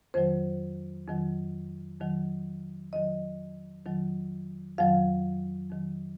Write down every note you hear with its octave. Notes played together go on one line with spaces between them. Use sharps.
F2 D#3 F#3 C5
F2 D#3 F#3
F2 D#3 F#3
F2 D#3 F#3 D#5
F2 D#3 F#3
F2 D#3 F#3 F5
F2 D#3 F#3